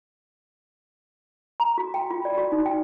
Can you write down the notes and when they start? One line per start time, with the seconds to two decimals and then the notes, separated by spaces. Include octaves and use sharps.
1.60 A#5
1.78 F#4
1.94 G5
2.10 F4
2.25 D5
2.37 F#4
2.52 D#4
2.66 G5